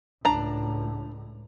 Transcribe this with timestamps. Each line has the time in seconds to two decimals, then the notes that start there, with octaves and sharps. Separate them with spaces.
0.25 C#2 A2 D4 A#5